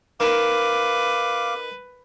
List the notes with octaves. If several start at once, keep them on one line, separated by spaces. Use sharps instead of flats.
D#3 B4 F5 D6